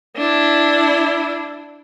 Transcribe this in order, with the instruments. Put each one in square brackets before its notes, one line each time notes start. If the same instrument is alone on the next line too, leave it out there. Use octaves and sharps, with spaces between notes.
[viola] D4 E4